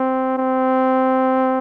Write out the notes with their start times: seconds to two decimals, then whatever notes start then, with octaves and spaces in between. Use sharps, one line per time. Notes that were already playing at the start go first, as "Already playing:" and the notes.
Already playing: C4
0.38 C4